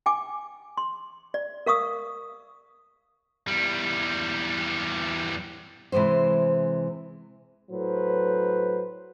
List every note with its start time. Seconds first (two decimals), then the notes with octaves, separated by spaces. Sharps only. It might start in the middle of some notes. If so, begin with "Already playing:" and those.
0.06 G5 G#5 D6
0.77 C6
1.34 D5
1.66 A#4 F5 C#6 D#6 E6
3.48 E2 G3
5.92 C3 E3 F#3 G#3 C5
7.71 A2 F#3 B4 C5